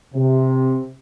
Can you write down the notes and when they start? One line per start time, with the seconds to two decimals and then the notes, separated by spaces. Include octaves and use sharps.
0.15 C3